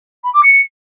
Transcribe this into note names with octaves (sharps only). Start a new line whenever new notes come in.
B5
D6
C#7